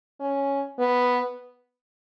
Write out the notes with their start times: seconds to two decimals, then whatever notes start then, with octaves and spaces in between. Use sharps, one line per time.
0.20 C#4
0.79 B3